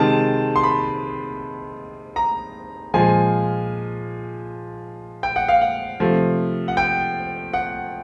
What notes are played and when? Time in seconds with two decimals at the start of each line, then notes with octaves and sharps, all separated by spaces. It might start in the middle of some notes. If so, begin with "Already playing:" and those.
Already playing: C3 D#3 G#3 A5
0.56 C6
0.63 B5
2.16 A#5
2.94 A#2 F3 G#3 G#5
5.23 G5
5.36 F#5
5.48 F5
5.61 F#5
6.00 C3 F3 A3
6.68 F#5
6.77 G5
7.54 F#5